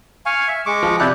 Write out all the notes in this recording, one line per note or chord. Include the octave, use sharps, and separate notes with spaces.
F5 G#5 C#6
E5
G#3 C#6 D6
F3 F4
C3 E4 G4 D5 F#6